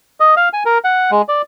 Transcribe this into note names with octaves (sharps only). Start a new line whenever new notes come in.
D#5
F5
G#5
A#4
F#5
G#3
D5